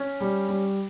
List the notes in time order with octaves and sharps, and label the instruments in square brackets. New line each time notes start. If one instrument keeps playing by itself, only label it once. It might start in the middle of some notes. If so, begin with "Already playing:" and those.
Already playing: [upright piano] C#4
G3
G3